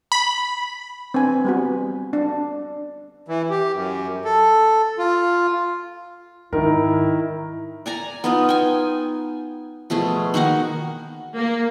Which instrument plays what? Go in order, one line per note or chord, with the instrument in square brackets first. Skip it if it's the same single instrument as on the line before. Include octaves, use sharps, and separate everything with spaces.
[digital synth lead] B5
[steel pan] C4 D4 B4 G#5
G3 B3 F#4
D4
[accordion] E3
G4
F#2
A4
F4
[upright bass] G#2 [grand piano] D#3 A#4 [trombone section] E4
[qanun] D5 G#5 A#5
B3 D#4 F4
G5 G#5
B2 F3 A3 G#4
D#3 A#3 F#4 F#5
[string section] A#3